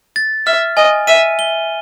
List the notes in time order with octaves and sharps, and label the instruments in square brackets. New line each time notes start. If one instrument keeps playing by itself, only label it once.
[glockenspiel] A6
[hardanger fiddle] E5 [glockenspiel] F6
[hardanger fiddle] D#5 [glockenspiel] G#5
[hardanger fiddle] E5 [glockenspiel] D#7
[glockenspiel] G7